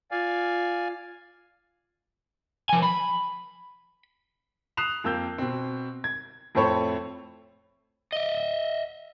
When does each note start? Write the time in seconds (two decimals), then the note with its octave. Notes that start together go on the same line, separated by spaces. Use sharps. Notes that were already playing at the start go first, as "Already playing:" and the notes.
0.11 F4 D5 F5 G#5
2.69 F3 G#5
2.82 B5
4.77 D#6 F#6 C7 E7 F7
5.04 F2 A#3 E6 G6
5.38 B2 C4
6.04 G#6
6.55 F2 A2 A4 C5 C#5 B5
8.12 D#5 E5